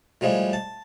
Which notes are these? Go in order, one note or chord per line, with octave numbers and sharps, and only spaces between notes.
A2 F3 G3 G#3
A5